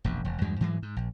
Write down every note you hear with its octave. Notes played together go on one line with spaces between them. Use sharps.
E1 A#1 F#2
E1
E2 G2 F#3 G#3
G#2 E3 F#3 G#3
G#2
A#1